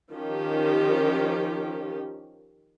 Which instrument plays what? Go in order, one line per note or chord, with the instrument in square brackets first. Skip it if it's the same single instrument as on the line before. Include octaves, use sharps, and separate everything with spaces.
[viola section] D#3 F3 C#4 G4